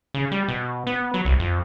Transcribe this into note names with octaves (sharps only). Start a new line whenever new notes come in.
C#3
G3
B2
B3
F#3
C2
F2